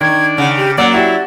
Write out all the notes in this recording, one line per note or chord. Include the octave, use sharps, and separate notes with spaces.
D#3 D4 G#6
C#3 F#5
G4
F#3 A#3 D5 F#5
E4 F#4 G4 D5